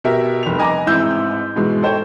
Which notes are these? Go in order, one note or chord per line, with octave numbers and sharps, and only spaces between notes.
B2 G4 A#4 E5
F1 G3 G4 F7
D#5 G#5 A#5 D6
A1 G#2 C4 E4 E6 G6
G#2 B2 E3 G#3
A4 C5 C#5 G5